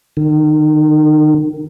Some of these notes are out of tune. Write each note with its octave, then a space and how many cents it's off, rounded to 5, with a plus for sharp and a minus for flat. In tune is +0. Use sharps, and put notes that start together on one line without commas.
D#3 -30